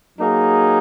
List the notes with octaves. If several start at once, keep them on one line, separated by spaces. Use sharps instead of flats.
F#3 A#3 D#4 G#4